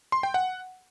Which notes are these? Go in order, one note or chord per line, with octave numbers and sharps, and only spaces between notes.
C6
G5
F#5